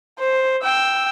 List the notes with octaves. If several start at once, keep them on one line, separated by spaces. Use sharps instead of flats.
C5
G5 E6